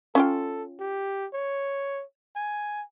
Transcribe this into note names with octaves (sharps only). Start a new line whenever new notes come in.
C#4 F4 A4 G5
G4
C#5
G#5